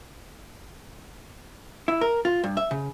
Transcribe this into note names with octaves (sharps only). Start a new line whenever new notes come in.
E4
A#4
F4
G2
E5
C#3